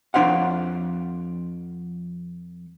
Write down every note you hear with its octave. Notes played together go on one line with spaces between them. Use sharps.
F2 D4 C5 F5 F#5